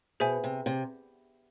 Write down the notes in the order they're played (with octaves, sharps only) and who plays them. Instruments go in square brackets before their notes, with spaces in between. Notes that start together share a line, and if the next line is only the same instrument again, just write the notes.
[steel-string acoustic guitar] B2 [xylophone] G#4 C5 E5 G#5
[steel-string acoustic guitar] C3
C3